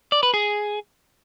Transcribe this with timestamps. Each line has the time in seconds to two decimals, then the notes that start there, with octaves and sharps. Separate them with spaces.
0.12 D5
0.23 B4
0.34 G#4